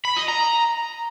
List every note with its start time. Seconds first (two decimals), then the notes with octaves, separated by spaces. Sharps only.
0.05 B5
0.17 D#5
0.28 A#5